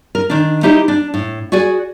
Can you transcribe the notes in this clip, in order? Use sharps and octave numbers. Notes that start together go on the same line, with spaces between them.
A#4
D#3 D4
D#4 E4 G4 C5 D#5
D4
A2
F#4 G#4 D5 G#5